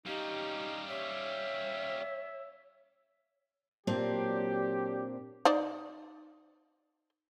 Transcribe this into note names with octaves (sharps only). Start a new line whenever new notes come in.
G3 C#4 D#4 G4 F5
C#5 E5
A#2 F#3 C4 D4 G4
D#4 C5 D5